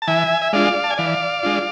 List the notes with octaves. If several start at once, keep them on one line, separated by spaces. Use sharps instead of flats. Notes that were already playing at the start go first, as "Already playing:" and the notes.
A5
E3 E5 G#5
E5
G#3 D4 F4 D5 F5
A5
G#5
E3 D5 F5
G#3 D4 F4